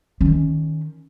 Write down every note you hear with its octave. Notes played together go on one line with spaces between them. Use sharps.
D#3 C#4